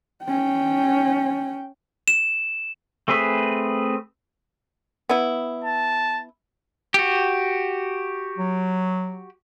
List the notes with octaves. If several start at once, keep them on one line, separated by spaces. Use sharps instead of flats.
C#4 G5
E7
A3 C4 G#4 B4 E5
B3 E4
A5
F#4 G4
F#3